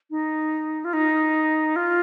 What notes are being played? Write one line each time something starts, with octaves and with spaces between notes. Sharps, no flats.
D#4
F4
D#4
F4